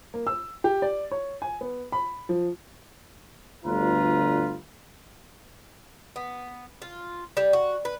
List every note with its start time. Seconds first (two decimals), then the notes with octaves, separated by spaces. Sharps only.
0.14 A#3
0.27 E6
0.64 G4
0.82 D5
1.11 C#5
1.42 G#5
1.61 B3
1.92 B5
2.29 F3
3.65 G1 D2 G2 F4 B4 A#5
6.16 B3
6.82 F4
7.37 G3
7.53 F#4
7.85 B4